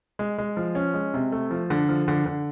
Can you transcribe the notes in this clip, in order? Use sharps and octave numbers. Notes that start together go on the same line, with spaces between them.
G#3
G#3
F3
C#4
G#3
C3
A3
F3
D3
F3
D3
D3